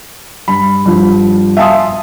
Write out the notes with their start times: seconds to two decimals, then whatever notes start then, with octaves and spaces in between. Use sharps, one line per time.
0.48 G2 B5
0.86 G2 F3
1.57 E5 F5 G#5 A5 C6 D#6